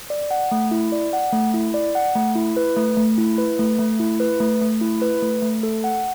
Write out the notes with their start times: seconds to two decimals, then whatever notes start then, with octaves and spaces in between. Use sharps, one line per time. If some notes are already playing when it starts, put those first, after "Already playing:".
0.10 D5
0.31 F#5
0.51 A3
0.71 E4
0.92 D5
1.13 F#5
1.33 A3
1.54 E4
1.74 D5
1.95 F#5
2.15 A3
2.36 E4
2.57 B4
2.77 A3
2.97 A3
3.18 E4
3.38 B4
3.59 A3
3.79 A3
4.00 E4
4.20 B4
4.40 A3
4.61 A3
4.81 E4
5.02 B4
5.22 A3
5.42 A3
5.63 A4
5.84 F#5